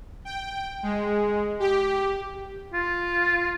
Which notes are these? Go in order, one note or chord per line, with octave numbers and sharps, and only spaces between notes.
G5
G#3
G4
F4